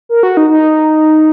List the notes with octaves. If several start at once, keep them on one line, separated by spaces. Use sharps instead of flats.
A#4
F#4
D#4
D#4